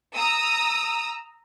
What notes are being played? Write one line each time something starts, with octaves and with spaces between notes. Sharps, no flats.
A#5 D#6 E6